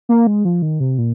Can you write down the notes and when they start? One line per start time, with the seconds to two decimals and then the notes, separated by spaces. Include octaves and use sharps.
0.09 A#3
0.27 G#3
0.45 F3
0.62 D#3
0.80 C3
0.98 A#2